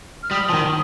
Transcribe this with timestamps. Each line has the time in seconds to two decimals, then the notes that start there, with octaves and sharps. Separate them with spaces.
0.23 F6
0.31 G3 D#6
0.49 F3
0.54 D#3